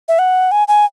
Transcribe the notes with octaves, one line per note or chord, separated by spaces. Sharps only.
E5
F#5
G#5
G#5